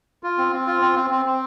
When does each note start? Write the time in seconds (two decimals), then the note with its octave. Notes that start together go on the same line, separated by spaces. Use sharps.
0.23 F4
0.38 C4
0.53 C4
0.67 F4
0.82 C4
0.96 C4
1.10 C4
1.26 C4